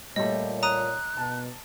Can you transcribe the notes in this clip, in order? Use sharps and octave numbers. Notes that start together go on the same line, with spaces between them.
A#2 G3 A3 C#5 D#5
A#5 D#6 F#6 D#7
B2 A5